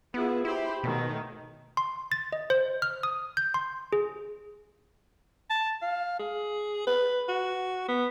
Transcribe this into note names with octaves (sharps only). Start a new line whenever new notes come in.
B3 E4 F4 G#4
E4 G4 C5 B5
B2 D#3 A3 C#5
C6
A6
D#5
C5
F6
D#6
G6
C6
G#4
A5
F5
G#4
B4
F#4
B3